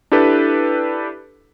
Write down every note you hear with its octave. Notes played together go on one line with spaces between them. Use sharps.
D4 E4 G4 A4 B4